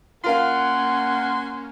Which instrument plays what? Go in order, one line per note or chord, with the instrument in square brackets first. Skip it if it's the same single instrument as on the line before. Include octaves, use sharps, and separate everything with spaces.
[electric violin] A#3 C#4 [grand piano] F4 A#4 F5 [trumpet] F#5 [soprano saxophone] C6